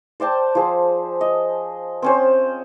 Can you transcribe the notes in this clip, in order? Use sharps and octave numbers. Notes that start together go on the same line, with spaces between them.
C5 D5 G5 A5
F3 G#4
D#5
C4 C#4 C5